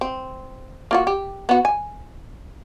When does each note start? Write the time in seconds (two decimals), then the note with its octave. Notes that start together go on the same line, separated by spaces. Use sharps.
0.01 C4
0.91 A#3 F4 F#4
1.07 G4
1.49 B3 F#4
1.65 G#5